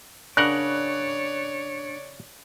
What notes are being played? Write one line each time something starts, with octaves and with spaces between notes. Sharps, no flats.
C#3 D4 A#4 C#5 D5 F#5 F#6